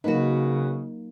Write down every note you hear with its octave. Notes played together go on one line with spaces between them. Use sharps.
C#3 F#3 A#3 D#4 F#4 B4